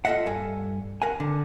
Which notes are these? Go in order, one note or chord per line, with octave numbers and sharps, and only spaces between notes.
F4 A4 B4 D#5 E5 F#5
G2 A4 G#5
A#4 F#5 G#5
D3